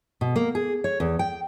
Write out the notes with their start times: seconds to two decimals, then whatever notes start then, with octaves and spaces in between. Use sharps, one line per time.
0.21 B2
0.36 A#3
0.55 G#4
0.84 C#5
1.00 E2
1.19 G5